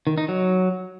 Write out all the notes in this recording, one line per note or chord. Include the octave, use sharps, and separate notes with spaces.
D#3
D#4
F#3